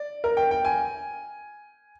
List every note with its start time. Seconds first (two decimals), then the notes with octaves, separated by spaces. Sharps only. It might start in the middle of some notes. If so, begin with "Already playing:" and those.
Already playing: D5
0.24 A#4
0.37 G5
0.51 G5
0.65 G#5